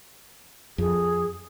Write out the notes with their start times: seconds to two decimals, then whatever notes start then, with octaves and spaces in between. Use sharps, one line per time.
0.78 F2 G#4